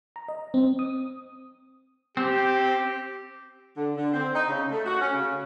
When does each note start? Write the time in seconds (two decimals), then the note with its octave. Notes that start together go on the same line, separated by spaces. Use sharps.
0.16 A#5
0.28 D#5
0.54 C4
0.79 D#6
2.17 C4 G4
3.77 D3
3.95 D3
4.14 C4
4.34 D#4
4.47 C#3
4.71 A3
4.86 F#4
5.01 C#4
5.13 C#3